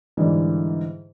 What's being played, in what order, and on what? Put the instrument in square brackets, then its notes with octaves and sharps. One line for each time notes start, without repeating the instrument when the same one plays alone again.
[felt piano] G#2 D3 E3 G3